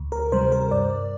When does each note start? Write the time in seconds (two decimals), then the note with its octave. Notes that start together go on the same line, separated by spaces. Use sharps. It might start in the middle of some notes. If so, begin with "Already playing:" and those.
Already playing: D2
0.12 A#4
0.32 C3 G3 C5
0.52 A#4
0.71 G2 D5